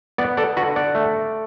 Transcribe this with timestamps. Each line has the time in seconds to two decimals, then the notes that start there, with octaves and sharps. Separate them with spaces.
0.18 B3 D5 F#5
0.37 A4 D5
0.57 D3 F#4 B4
0.76 D5 F#5
0.95 A3